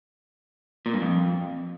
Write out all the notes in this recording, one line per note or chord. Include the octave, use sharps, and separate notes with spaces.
A#2
G2
F2